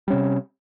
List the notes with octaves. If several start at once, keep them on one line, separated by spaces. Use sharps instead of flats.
C3 G3 C#4